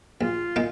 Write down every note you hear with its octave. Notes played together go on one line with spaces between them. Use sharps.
A#1 F4
A#2 A#3 D#4